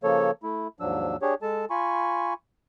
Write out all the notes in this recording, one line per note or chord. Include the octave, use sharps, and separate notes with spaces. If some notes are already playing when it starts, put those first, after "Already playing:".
C#3 F3 A#3 A4 C#5
A3 E4
D#2 G#2 F3 F#3 D4 E6
D4 G4 G#4 C#5
G#3 A4 A5
F4 G#5 B5 C#6